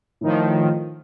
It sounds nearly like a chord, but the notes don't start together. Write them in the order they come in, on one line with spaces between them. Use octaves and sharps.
A2 D#3 F3